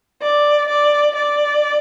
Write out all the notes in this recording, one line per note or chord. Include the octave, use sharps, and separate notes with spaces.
D5
D5
D5